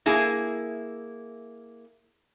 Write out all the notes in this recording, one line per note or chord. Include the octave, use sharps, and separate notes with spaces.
A#3 E4 G#4